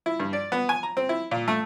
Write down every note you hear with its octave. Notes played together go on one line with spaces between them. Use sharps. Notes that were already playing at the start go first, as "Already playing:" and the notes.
E4
G2
D5
B3
G#5
A#5
C4
E4
A#2
A3